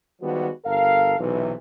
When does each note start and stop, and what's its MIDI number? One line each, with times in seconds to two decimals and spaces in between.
0.22 0.48 51
0.22 0.48 53
0.22 0.48 55
0.22 0.48 56
0.22 0.48 59
0.22 0.48 66
0.65 1.15 31
0.65 1.15 69
0.65 1.15 70
0.65 1.15 77
1.19 1.53 35
1.19 1.53 48
1.19 1.53 52